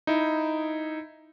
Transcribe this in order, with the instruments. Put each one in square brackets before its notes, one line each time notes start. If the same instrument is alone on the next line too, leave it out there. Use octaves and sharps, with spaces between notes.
[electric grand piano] D#4 E4